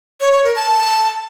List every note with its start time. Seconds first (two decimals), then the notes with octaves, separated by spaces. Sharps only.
0.21 C#5
0.32 C#5
0.44 A#4
0.56 A5